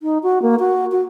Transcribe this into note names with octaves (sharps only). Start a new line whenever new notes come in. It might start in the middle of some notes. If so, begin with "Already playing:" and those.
D#4
F#4
A#3
F#4
F#4